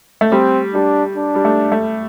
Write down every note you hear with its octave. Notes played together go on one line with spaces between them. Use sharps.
A3
G3 C4
G3 D4
D4
G3
A3
A3